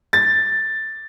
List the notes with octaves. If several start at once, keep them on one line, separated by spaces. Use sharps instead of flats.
A6